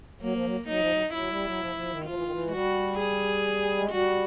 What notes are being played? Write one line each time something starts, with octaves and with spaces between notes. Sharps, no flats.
F#3 A#3
F3
F#3
F#3 D#4
F3
F#3
F#3 E4
G3
F#3
F3
F3
D#3
F3 F4
E3
D#3
E3
G#3
G3 F#4
G#4
G#3
G3 F#4